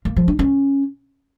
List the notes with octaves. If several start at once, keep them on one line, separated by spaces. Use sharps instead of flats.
A#3
F3
D4
C#4